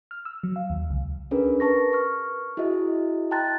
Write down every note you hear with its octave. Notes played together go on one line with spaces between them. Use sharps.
F6
E6
F#3
F5
D#2
C#2
C#4 D4 G#4 A#4 B4
A#4 B4 A5 C#6 A#6
C#6 F6
E4 F#4 G#4 D#5 E5
G5 A5 A#5 C6 F#6 A6